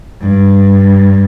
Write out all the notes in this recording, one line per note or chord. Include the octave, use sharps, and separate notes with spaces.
G2